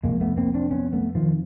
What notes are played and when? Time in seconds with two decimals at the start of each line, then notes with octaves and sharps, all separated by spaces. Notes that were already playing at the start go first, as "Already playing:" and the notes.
0.03 F2 C3 G#3 A#3
0.21 A3 B3
0.37 A#3 C4
0.54 C4 D4
0.71 B3 C#4
0.93 A3 B3
1.15 D#3 F3